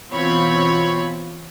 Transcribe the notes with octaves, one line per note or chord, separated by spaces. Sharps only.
B2 E3 C4 F4 C#5 B5